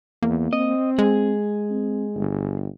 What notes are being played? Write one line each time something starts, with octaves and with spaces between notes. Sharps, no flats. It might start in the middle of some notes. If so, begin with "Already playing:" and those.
E2 A#3
C4 D#5
G#3 G#4
C4
G1